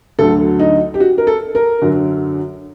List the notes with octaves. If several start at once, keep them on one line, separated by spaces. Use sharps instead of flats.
D2 D3 F#3 A4
D#4
G4
F#4
A#4
A4
A#4
F#2 D3 F#3